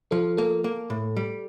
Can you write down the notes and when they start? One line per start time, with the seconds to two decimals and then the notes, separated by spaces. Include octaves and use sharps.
0.11 F3 A4
0.37 A#3 A4
0.64 A#3
0.90 A2
1.17 G3